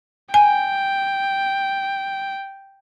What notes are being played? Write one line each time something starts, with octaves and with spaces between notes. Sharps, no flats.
G5 G#5